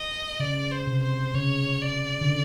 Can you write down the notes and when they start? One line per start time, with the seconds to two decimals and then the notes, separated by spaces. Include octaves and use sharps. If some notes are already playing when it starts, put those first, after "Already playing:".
Already playing: D#5
0.40 C#3 D5
0.71 C5
0.87 C3
1.03 C5
1.35 C#3 C#5
1.81 D5
2.21 D3
2.29 C#3